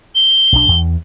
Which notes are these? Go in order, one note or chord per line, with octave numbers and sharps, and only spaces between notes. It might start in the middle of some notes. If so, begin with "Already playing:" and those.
G7
B1 D4
E2